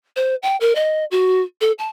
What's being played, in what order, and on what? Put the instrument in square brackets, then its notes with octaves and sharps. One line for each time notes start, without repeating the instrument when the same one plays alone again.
[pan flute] C5
G5
A#4
D#5
F#4
A4
A5